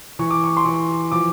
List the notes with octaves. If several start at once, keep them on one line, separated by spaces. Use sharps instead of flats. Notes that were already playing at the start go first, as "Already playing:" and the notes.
E3 C#6
D6
C#6
C6
E3 C#6
F3 D6